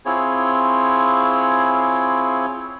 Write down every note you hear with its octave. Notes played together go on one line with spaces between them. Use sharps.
C4 E4 F4 G#4 C#5